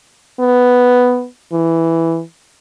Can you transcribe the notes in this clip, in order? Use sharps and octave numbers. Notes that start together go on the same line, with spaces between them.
B3
E3